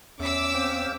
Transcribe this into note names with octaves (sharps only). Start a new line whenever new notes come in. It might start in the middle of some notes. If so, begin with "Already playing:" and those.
E2 C#4 E5 D6 E6 B6
C4 F5 G5